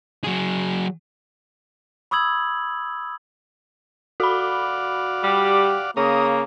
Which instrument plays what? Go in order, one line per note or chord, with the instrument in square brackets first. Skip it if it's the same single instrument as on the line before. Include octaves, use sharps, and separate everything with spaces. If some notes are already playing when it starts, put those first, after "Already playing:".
[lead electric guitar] F#3 G#4
[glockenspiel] B5 C#6 D#6 E6 G#6 F#7
[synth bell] F#4 B5 [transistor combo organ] D5 F5 F#5
[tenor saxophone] G3 [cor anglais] G4
[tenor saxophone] C#3 [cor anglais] A#3 [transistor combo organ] A#5 D#6